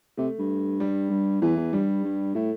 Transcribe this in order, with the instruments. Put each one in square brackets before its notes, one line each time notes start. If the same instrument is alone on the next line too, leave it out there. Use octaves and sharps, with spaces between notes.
[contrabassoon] C3 [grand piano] A3
[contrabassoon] G2
[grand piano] G3
[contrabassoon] G2
[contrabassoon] E2 [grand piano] E3
[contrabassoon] E2
[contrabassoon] G2 [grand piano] G3
[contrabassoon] G2
[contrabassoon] A2 [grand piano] A3